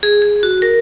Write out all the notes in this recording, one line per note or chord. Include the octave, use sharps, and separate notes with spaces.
G#4
G#4
F#4
A#4